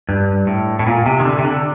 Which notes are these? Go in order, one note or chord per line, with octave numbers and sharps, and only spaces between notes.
G2
A2
A2
A#2
C3
D#3
D3
C3
D3